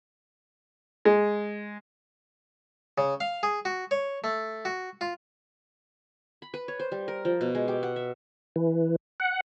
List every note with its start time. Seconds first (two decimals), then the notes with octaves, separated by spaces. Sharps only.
1.05 G#3
2.98 C#3
3.20 F5
3.43 G#4
3.65 F#4
3.91 C#5
4.24 A3
4.65 F#4
5.01 F4
6.42 B5
6.54 B4
6.68 C#5
6.79 C5
6.92 G3
7.08 A#4
7.25 F3
7.41 B2
7.55 G#3
7.68 G4
7.83 F#5
7.96 E5
8.56 E3
9.20 F#5